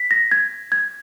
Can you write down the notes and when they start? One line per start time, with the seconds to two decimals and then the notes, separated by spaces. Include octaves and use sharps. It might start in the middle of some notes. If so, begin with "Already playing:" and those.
Already playing: B6
0.11 A#6
0.31 G#6
0.72 G#6